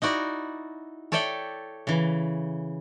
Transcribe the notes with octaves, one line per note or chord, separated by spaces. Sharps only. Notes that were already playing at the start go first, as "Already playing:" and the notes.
D#4 E4 F#4 D5
A4 C#5 D5 E5 G5
C#3 E3